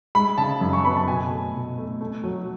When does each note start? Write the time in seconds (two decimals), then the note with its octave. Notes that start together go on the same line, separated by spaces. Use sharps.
0.15 G#3 B5
0.38 C#3 A5
0.61 F#2
0.73 C#6
0.85 B3 B5
0.97 A5
1.08 B2 G#5
1.30 A3
1.55 B2
1.78 A3
2.01 A3
2.24 F#3